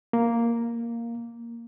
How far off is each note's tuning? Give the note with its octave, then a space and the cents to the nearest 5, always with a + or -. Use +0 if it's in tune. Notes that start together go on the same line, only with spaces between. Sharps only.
A#3 +0